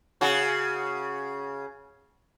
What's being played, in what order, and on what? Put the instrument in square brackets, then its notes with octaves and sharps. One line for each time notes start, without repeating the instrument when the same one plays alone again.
[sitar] C#3 F#4